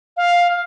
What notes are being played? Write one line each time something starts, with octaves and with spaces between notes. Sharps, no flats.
F5